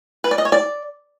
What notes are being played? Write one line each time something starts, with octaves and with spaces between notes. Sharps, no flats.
B4
D5
D#5
C#5
D5